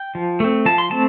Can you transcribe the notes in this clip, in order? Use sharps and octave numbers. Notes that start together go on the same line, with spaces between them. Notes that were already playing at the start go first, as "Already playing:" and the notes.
Already playing: G5
F3
A3 C4
F3 A5
C6
A3 C4 A5